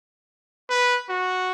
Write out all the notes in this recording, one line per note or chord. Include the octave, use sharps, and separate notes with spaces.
B4
F#4